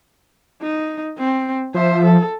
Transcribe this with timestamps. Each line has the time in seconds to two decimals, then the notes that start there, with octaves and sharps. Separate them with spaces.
0.62 D#4
1.19 C4
1.74 F3 C5 E5
2.05 A4